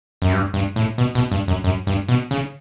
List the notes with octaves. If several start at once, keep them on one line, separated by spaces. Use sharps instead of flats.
F#2
G2
G2
A2
B2
B2
G2
F#2
F#2
G2
B2
C#3